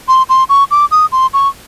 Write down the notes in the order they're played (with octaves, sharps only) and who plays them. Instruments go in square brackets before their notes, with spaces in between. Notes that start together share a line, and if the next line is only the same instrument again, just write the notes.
[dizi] C6
C6
C#6
D6
D#6
C6
C#6